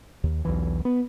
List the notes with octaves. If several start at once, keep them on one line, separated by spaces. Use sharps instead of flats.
D#2
B1 E2 E3
B3